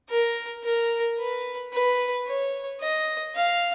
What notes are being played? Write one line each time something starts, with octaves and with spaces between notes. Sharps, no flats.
A#4
A#4
B4
B4
C#5
D#5
F5